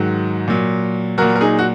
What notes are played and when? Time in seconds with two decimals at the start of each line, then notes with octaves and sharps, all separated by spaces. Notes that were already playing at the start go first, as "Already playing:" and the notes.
Already playing: G#2 D#3 F#3 F#4
0.47 A#2 F#3
1.18 A#2 F#3 F#4 A#4
1.35 A#4
1.41 D#4 G#4
1.59 F#4